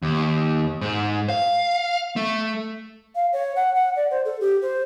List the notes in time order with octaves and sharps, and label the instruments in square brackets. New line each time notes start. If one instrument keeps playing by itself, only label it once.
[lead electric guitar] D#2
G#2
F5
A3
[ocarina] F5
C#5
F#5
F#5
D5
C5
A4
G4
C5